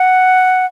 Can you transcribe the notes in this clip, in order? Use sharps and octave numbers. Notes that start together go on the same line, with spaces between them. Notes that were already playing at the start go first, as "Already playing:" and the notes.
Already playing: F#5